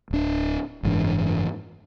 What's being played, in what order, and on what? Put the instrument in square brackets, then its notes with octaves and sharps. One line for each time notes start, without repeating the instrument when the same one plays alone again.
[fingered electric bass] D1 D4
F#1 G#2 E3 D4